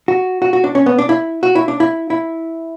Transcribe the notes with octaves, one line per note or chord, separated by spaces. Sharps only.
F#4
F#4
F#4
D4
C#4
B3
D4
E4
F#4
E4
D4
E4
E4